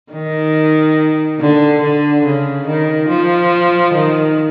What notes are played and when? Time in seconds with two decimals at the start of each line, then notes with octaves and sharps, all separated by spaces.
0.12 D#3
1.40 D3
1.81 D3
2.25 C#3
2.66 D#3
3.09 F3
3.94 D#3